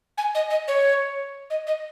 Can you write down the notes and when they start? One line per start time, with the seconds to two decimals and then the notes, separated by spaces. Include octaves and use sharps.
0.17 G#5
0.34 D#5
0.50 D#5
0.67 C#5
1.50 D#5
1.67 D#5